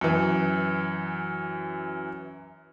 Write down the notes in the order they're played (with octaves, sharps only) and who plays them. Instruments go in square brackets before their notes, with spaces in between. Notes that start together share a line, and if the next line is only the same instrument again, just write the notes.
[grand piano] F#2 E3